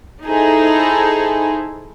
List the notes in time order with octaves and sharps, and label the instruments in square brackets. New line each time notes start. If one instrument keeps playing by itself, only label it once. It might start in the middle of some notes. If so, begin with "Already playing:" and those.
[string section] D#4 E4 G#4 A4 C5